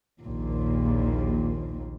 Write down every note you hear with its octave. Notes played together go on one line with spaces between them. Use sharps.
A#1 D#2 A#2